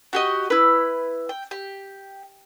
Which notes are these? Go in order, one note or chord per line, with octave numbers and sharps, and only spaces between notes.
F#4 G4 D#5
E4 B4
G5
G4